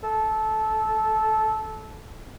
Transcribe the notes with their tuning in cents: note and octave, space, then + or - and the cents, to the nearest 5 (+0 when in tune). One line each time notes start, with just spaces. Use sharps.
A4 -15